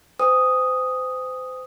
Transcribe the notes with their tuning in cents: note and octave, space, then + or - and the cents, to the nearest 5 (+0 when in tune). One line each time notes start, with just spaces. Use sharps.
C5 -35 G#5 -40 D#6 +0